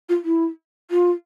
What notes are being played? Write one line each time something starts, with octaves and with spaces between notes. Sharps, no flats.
F4
E4
F4